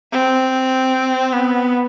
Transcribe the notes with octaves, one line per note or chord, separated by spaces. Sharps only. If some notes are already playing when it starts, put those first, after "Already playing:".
C4
B3